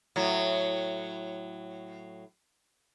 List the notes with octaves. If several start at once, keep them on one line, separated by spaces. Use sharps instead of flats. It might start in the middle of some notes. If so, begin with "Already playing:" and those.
A2 F#3